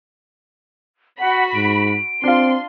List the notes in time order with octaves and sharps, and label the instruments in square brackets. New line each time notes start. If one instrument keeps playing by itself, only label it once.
[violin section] F#4 B5 [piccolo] F#5
[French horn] G#2 [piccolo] D7
[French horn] C4 [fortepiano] D4 F4 [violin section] C6